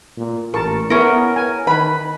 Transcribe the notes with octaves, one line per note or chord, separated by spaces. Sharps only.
A#2
A1 A#4 A5 C#6
B3 C#4 E4 A#4
G#5
D#3 B4 B5